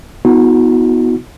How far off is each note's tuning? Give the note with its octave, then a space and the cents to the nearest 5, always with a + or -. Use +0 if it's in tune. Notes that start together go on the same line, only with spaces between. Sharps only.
B3 +0 D#4 +40 F#4 -25